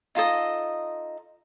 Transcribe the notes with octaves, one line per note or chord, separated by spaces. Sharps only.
D#4 F4 A4 D#5